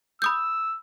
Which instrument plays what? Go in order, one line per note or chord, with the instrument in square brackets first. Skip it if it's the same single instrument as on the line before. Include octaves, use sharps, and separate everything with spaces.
[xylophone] B5 D#6 G6 [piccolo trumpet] E6